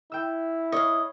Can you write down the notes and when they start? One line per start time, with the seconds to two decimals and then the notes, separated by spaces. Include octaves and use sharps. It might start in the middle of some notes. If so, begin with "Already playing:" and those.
0.12 E4 G5 E6
0.72 C#5 D#5 F5